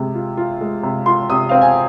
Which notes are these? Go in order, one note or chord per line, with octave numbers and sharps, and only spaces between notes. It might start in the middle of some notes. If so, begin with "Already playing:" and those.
Already playing: C3 G#3
F4
F4
G#3
C3
F4 C6
C3 D#6
C4 F5
G#5